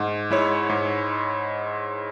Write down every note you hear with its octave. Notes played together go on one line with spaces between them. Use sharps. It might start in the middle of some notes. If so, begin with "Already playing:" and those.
Already playing: G#2
G#3 E4 C#5
G#2